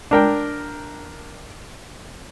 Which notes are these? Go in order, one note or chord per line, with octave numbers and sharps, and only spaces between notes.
D4 A#4 G5